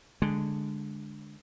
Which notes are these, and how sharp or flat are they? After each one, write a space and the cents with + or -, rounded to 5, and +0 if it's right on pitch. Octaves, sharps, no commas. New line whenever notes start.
D3 +0 G#3 +0